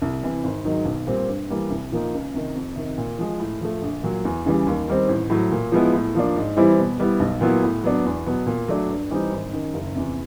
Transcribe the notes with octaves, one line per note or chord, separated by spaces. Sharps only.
C2
C3 E3
G#1
G#2 D#3 F#3
B1
A#2 G3 C4
G2
E3 G3 A#3
C2
A#2 F3 A#3 D#4
C#2
C3 D#3
F2
C3 D#3
A#2
F3 G#3
A2
F3 A3
A#1
A#2 F#3
E2
C#3 E3 G3
D#2
D#3 G3 C4
A1
A2 F#3
A#2
F3 G#3 B3 E4
A2
F3 A#3 D4
G#2
E3 G3 C4 E4
B2
G3 B3 E4
B1
A#2 F#3 B3 E4
A2
F#3 B3 D4
E2
B2 F#3 B3
A#2
F#3 A3 D4
G2
E3 G3 C4 D#4
G#1
F#2 D#3
F#1
E2 C3